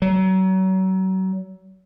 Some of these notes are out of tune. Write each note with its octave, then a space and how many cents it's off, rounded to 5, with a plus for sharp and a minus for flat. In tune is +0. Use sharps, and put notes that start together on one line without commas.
F#3 +30